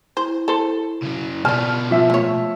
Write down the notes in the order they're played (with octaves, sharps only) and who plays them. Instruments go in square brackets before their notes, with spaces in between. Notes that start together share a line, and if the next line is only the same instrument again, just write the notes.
[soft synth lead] E4 [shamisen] C5
[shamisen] A4 C5
[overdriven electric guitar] C#3 F#3
[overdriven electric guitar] B2 F4 [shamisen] D5 A5 [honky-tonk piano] F6
[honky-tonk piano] F3 E5 [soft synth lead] D6
[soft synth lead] A3 [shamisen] A#3 C#5